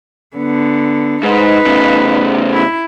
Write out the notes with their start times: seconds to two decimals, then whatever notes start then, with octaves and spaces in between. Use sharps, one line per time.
0.36 D3 B3
1.23 G#2 D#4 B4
1.66 A2 C#3
2.52 E4